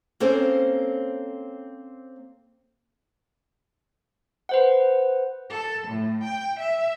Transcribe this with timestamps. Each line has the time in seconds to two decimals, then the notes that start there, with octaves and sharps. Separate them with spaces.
0.20 A#3 C4 C#4 A4 C5
4.49 B4 C5 F#5
5.50 A4
5.87 A2
6.24 G5
6.59 E5